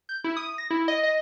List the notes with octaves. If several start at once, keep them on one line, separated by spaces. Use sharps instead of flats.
G6
E4
D#6
A#6
E4
D#5
D#5